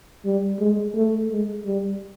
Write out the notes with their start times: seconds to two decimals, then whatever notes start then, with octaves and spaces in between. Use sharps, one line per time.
0.25 G3
0.59 G#3
0.95 A3
1.30 G#3
1.65 G3